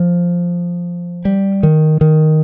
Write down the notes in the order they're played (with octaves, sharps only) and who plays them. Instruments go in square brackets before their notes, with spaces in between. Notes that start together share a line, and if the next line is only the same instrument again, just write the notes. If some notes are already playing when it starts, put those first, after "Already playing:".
Already playing: [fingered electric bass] F3
G3
D#3
D#3